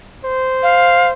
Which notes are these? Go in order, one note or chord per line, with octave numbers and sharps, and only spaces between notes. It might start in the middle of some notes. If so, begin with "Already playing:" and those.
C5
F5